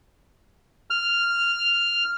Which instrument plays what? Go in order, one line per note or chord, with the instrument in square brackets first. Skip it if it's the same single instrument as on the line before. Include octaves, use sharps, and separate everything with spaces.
[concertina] F6